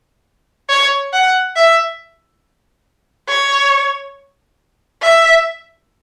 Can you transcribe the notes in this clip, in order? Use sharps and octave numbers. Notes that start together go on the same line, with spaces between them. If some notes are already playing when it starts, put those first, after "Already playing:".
C#5
F#5
E5
C#5
E5